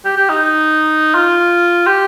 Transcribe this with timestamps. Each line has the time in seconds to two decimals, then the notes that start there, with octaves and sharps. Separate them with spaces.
0.04 G4
0.16 G4
0.29 D#4
1.14 F4
1.86 G4